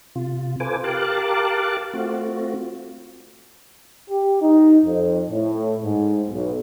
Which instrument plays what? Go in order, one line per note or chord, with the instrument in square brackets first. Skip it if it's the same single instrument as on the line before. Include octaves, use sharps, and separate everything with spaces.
[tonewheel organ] C3 F4
F4 A4 B4 C5 G#5 D6
G4 A#4 F5 A5 D6 F#6
A3 C4 F4 F#4
[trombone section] G4
D#4
F2
A2
G#2
B1